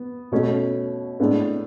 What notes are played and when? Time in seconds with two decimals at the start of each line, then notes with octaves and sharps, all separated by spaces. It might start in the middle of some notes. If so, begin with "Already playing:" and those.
Already playing: B3
0.32 B2 A3 C#4
1.20 A2 G#3 B3 D4